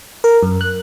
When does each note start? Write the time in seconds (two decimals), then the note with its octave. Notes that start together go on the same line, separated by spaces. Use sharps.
0.24 A#4
0.43 F#2
0.61 F#6